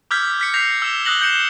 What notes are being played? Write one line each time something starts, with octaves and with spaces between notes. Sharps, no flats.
D6 E6 F6 G6 G#6 B6
F6 B6 C#7
G6 A#6 C7 F7
E6 E7 G7
D#6 E6 F#6 A#6 F#7 G7
G6 C7 C#7 E7 G7